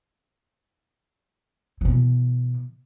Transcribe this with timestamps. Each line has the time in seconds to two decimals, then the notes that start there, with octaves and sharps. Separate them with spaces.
1.81 B2 E3